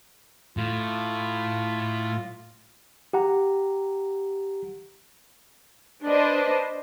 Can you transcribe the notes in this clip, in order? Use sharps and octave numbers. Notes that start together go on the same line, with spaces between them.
A2 F4
G4 F#5 A#5
D4 B4 C5 D#5